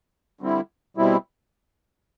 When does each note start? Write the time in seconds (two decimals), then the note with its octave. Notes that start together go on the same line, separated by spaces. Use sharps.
0.41 D3 G3 C4 E4
0.97 B2 G3 C4 E4